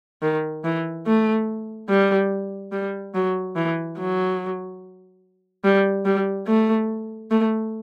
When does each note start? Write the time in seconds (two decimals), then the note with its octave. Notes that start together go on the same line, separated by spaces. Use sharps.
0.22 D#3
0.65 E3
1.06 A3
1.89 G3
2.72 G3
3.14 F#3
3.56 E3
3.98 F#3
5.64 G3
6.05 G3
6.47 A3
7.31 A3